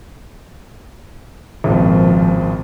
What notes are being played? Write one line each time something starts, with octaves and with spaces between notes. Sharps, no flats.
G#1 C#2 A#2 F3